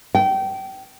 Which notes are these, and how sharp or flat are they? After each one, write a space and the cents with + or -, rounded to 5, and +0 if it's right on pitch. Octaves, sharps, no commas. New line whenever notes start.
G5 -25